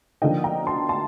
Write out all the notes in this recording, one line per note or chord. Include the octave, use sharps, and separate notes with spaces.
D3 F3 A#3 D#4 D#5 G5
G5 A#5
A5 C6
A5 C6